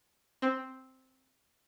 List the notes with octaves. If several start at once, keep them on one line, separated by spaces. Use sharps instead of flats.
C4